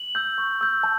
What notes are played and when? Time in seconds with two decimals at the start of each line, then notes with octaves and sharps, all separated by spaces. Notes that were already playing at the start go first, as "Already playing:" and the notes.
Already playing: F#7
0.15 E6 G6
0.38 C#6
0.61 E6 G6
0.83 A5